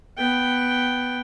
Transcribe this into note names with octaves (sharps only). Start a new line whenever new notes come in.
B3 G5